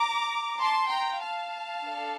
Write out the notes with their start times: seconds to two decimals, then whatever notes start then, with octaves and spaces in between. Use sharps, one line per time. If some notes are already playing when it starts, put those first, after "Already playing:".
Already playing: A#5 D6
0.60 A5 C6
0.90 G5 A#5
1.22 F5 A5
1.84 D4 A4